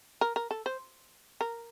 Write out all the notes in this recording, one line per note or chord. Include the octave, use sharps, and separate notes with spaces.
A#4
A#4
A4
C5
A#4